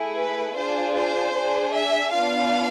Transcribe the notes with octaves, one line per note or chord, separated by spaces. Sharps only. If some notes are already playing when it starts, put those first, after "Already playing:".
Already playing: A3 E4 G#4
B4
D4 F4 G#4 C5
C5
D4 G#4
E5
B3 D4 F4 F5